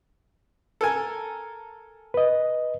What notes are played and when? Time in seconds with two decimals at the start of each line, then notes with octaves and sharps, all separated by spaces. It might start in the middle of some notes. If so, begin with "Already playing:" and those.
0.81 A4 A#4 G#5
2.14 B4 D#5